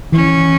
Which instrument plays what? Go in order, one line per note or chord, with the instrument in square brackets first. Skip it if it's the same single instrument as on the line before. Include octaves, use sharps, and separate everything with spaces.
[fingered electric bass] E3 [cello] C#4